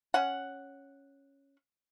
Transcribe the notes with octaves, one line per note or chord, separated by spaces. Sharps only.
C#4 F#5